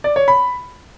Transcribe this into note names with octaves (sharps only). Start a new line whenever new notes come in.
D5
C#5
B5